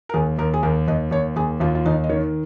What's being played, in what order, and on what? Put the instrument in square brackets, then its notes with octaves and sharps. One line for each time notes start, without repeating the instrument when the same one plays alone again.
[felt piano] A#4
[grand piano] D#2 [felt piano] G#4
[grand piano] D#2 [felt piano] A#4
[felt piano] G#4
[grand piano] D#2 [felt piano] A#4
[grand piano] D#2 [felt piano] D#5
[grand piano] D#2 [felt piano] C#5
[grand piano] D#2 [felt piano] G#4
[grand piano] D#2 [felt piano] F4
[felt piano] F4
[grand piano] D#2 [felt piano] D#4
[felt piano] D#5
[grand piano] D#3 [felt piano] C#5